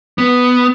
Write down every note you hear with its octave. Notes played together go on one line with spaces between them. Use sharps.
B3